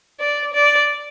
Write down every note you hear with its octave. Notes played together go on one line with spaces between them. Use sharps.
D5
D5